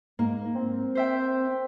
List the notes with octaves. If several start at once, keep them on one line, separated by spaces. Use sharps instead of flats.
G#2 A#3
C4
C5 E5 G5